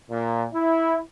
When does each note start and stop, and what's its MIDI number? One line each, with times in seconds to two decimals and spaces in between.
0.11 0.45 46
0.54 0.99 64